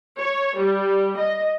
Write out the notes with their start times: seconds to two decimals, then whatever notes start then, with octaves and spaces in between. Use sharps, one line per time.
0.17 C#5
0.57 G3
1.19 D#5